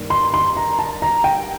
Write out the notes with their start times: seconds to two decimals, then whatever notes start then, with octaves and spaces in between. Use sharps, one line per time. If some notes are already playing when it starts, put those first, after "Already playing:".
Already playing: G2 D#3 G3 A#3
0.10 C6
0.34 C6
0.57 A#5
0.79 A5
1.02 A#5
1.24 G5